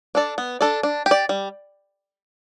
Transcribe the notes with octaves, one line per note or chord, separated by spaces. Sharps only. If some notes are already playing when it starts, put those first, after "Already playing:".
D4 A4 D5
B3
D4 A4 D5
D4
G4
D5
G3